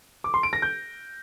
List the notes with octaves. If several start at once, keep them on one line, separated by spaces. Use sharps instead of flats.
D6
C6
D7
A#6
G6